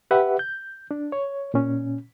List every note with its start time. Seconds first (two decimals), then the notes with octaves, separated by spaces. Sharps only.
0.11 G4 B4 E5 F#5
0.39 G6
0.91 D4
1.12 C#5
1.54 A#2 C#4